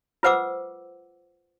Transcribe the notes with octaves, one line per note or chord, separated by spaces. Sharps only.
F4 B4 C5 F#5 D6 E6